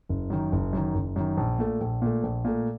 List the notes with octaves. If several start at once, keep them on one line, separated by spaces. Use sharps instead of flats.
F#1
F#2 D#3
F#1
F#2 D#3
F#1
F#2 D#3
A#1
A#2 A3
A#1
A#2 A3
A#1
A#2 A3